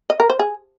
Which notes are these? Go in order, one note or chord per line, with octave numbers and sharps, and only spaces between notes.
D#5
A#4
C5
G#4